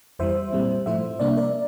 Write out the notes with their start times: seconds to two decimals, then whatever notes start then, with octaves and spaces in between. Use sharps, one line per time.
0.19 F2 E3 G3 C5 E5
0.53 A#2 G3 C4
0.86 A2 F3 A3 E4 C5 E5
1.19 C3 G3 A#3 D4 D5
1.28 E5
1.37 A#4 D5